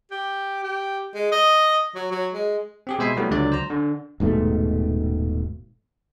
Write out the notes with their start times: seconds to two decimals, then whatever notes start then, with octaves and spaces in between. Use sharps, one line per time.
0.11 G4
0.64 G4
1.14 G#3
1.32 D#5
1.95 F#3
2.11 F#3
2.34 G#3
2.87 C4 G4 G#4
2.99 B2 G#3 C5 E5 G#5 C7
3.17 F#3 G3 A3 B3 E4
3.31 C#2 D3 F#3 D5
3.52 C5 A#5
3.70 D3
4.20 D#1 G#2 B2 A3